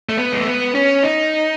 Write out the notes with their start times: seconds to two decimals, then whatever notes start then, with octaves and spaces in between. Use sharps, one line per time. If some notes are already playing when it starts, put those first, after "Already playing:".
0.09 A3
0.18 B3
0.32 G#3
0.40 A3
0.47 B3
0.75 C#4
1.03 D#4